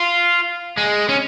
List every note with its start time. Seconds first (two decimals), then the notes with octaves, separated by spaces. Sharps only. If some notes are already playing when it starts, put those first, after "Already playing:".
Already playing: F4
0.78 G#3
1.09 C#4